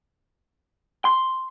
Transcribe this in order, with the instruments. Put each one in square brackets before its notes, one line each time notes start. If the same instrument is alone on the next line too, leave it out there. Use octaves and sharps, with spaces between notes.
[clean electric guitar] C6